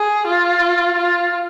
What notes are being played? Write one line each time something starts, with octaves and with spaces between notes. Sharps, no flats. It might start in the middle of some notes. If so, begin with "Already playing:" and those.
Already playing: G#4
F4
F4